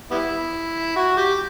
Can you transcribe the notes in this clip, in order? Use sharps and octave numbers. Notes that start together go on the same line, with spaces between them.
G3 B3 E4
F#4
G4